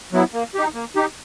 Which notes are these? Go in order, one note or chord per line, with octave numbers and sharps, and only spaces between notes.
F#3 B3 E4
A#3
D#4 G4
A#3
D#4 G4